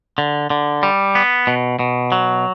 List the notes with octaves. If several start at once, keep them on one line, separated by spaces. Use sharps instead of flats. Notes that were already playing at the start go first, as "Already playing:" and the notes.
D3
D3
G3
B3
B2
B2
F#3